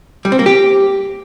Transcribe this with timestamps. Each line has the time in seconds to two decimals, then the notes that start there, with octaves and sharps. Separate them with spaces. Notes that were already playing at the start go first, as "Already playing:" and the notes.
0.25 G3
0.32 C4
0.39 A#3
0.46 G4